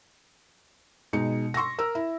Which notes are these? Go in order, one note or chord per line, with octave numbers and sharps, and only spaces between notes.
B2 G#3 D#4 C#7
C6 C#6 E6 A#6
A#4 E6
E4